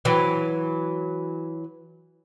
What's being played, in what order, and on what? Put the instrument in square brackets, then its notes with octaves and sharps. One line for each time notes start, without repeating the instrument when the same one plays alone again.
[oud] E3 F#3